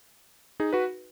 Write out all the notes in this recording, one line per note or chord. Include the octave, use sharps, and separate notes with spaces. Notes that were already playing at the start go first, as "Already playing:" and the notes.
D#4 G#4
F#4 B4